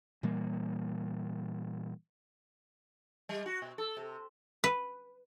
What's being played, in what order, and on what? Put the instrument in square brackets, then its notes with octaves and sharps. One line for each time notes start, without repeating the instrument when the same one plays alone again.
[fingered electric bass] A#2 E3 G3 A#3
[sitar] G3
F#4
B2
A4
C3
[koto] B4